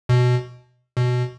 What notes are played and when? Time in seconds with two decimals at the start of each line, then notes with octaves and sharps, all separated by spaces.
0.09 B2
0.97 B2